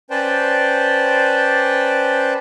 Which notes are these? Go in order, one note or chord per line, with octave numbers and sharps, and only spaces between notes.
C#4 B4 C5 D5 G5 A5